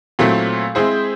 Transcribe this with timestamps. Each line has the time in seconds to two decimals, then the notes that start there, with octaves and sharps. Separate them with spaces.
0.19 A#2 F#3 A3 C4 E4
0.75 G#3 C4 E4 G#4 C5